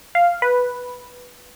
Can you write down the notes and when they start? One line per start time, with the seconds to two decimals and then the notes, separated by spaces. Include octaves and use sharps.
0.15 F5
0.42 B4